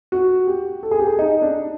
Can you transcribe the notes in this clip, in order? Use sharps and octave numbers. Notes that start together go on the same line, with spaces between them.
F#4
G4
A4
G#4
G4
G#4
D#4
D4